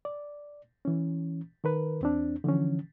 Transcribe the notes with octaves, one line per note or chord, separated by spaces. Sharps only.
D5
E3 C#4
D#3 A#4 B4
E2 C4 D4
D3 E3 F3 C#4